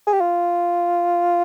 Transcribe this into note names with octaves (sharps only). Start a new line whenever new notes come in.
G#4
G4
F4